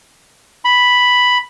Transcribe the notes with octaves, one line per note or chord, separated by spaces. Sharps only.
B5